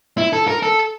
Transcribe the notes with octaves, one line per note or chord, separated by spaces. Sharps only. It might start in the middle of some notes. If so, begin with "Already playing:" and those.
E4
A4
A#4
A4